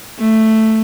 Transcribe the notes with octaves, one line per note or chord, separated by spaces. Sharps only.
A3